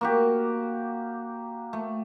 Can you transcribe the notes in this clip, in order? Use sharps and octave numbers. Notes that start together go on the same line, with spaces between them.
A#3 F#4 G4
A3